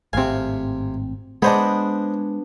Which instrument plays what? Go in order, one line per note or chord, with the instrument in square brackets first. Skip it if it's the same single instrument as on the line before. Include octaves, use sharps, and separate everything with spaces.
[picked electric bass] G#1 A2 C4 [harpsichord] C3 G#5 [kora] F5
[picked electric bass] G#3 [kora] B3 D4 [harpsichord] G#4 C5 D#5